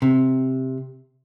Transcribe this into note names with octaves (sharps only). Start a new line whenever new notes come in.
C3